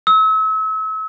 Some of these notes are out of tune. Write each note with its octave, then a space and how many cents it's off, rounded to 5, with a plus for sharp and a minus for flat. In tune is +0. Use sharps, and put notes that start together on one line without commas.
E6 -35